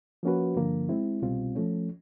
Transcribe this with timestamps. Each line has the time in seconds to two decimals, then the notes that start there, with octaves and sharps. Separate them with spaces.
0.23 F3 A#3 C#4 F#4 B4
0.56 G2 D3 F3 A#3
0.89 G#3 C4 E4
1.22 C2 B2 G3 C4 F4
1.55 F3 A3 C#4